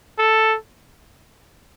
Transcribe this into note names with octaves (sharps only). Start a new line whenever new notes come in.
A4